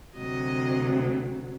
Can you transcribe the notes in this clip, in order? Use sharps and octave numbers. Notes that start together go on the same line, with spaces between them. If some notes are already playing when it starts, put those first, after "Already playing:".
D2 C3 F#3 D#5